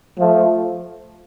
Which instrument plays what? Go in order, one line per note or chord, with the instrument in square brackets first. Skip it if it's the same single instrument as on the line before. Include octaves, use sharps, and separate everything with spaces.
[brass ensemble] F3 A3